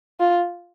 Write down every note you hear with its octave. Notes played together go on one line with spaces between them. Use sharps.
F4